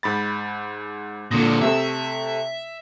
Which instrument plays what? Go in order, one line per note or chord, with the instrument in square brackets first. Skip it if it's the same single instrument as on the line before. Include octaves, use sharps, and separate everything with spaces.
[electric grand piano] G#2 B5 A6
[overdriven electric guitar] A#2 D3 [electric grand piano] C6 D#6 A#6
[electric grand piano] C3 A3 [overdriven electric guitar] E5